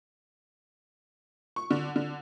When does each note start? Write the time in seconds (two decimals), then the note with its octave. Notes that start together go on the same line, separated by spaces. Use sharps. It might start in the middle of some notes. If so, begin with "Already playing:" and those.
1.56 C#6
1.71 D3
1.96 D3